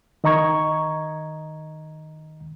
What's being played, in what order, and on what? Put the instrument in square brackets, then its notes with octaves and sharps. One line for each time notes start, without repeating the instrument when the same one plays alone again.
[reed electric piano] D#3 D#5 A#5 C#6 G#6